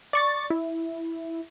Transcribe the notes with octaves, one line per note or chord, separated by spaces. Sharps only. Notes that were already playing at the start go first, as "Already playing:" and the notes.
D5 C#6 A6
E4